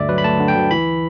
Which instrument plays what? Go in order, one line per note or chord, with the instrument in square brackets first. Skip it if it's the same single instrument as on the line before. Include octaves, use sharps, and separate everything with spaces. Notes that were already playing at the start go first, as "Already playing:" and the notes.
Already playing: [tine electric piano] D2 G2 D3 D5 E5
F#3 B4
B5
A3 A5
D3
G5
D2
E3 B5